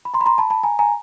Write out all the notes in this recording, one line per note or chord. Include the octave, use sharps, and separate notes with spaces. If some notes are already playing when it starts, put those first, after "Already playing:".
B5
A#5 C6
B5
A#5 C6
A5 B5
A5 B5
G#5 A#5
G#5 A#5